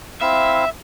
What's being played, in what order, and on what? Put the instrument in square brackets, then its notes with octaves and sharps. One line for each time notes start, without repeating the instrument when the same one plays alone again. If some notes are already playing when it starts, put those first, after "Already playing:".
[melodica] C4 E4 F5 [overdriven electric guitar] E5